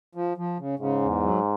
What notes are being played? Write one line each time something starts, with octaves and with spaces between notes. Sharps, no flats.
F3
F3
C#3
G#2 C#3
E2
F#3